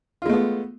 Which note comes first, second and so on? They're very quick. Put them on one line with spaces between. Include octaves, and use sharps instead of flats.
F4 G#3 A3 B3